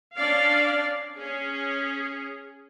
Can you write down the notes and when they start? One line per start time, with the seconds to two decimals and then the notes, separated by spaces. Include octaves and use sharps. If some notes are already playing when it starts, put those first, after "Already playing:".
0.16 C#4 D4 D5 F5
1.16 C#4 G#4